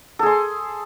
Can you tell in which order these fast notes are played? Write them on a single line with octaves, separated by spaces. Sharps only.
A4 G#4 C6